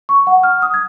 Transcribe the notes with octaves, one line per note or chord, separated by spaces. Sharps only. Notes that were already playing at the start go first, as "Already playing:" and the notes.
C#6
F#5
F6
D#6
G#6